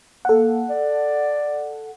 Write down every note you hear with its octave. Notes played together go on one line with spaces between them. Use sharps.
A#3 A4 F#5
D5